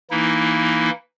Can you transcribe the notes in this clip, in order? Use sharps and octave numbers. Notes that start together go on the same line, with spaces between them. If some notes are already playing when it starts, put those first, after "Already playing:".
E3 A#3 D#4 E4